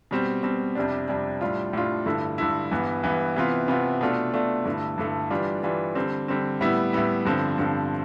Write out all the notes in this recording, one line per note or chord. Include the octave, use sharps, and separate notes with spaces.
B2 G3 C4
B2 G3 C4
F2 C3 G3 D4
F2 C3 G3 D4
A2 G3 D4 F4
A2 G3 D4 F4
G2 D3 A3 E4
G2 D3 A3 E4
G2 E3 B3
G2 E3 B3
C3 E3 B3 F4
C3 E3 B3 F4
B2 A3 D4 F4
B2 A3 D4 F4
G2 D3 A3 E4
G2 D3 A3 E4
E3 G3 D4 F4
E3 G3 D4 F4
D3 G3 C4
D3 G3 C4
A2 G3 B3 E4
A2 G3 B3 E4
G2 D3 F3 C4
G2 D3 F3 C4